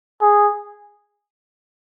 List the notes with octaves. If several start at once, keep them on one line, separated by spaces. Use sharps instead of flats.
G#4